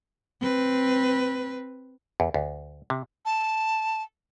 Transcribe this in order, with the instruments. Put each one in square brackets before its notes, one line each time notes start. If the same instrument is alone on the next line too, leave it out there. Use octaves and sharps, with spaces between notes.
[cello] C4 B4
[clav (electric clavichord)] E2
D2
C3
[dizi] A5